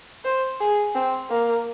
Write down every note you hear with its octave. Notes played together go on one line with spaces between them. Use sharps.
C5
G#4
C4
A#3